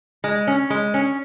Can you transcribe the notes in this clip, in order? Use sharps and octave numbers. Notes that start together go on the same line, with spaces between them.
G#3
C#4
G#3
C#4